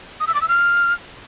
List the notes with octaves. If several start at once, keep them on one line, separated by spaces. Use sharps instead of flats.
D#6
E6
D6
E6
F6